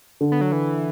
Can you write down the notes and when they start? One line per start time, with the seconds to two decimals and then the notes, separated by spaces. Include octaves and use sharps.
0.21 D3
0.32 B3
0.41 F#3
0.52 E3